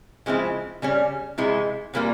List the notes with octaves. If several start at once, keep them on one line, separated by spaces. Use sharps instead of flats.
C#3 F3 G#3 C4 E4
C#3 G3 C#4
C3 E3 G#3 E4
C3 E3 G3 A#3 F4